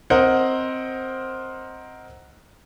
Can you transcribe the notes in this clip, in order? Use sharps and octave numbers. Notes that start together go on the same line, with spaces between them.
C4 A#4 C5 D#5 F#5